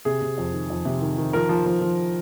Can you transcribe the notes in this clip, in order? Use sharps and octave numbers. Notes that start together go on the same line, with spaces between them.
C3 G#4
C3
F2
D#3
F2
C3
D#3
D#3
F3 A#4
F3
F3
F3